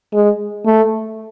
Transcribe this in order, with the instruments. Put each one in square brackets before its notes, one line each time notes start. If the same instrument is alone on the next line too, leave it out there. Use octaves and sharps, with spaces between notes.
[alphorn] G#3
A3